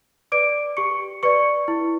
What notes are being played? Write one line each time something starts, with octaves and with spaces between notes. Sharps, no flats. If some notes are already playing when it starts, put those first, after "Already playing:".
B4 D5 D6 D7
G4 C#6 C#7
B4 D5 C#6 C#7
E4